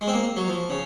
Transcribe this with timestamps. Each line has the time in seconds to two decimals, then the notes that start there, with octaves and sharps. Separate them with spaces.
0.01 G#3
0.08 C4
0.13 A#3
0.36 F#3
0.48 F3
0.70 C#3